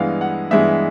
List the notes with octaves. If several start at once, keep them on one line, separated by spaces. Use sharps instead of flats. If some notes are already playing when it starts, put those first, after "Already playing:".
Already playing: G2 E3 G#3 B3 F5
F#5
G2 E3 G#3 B3 E5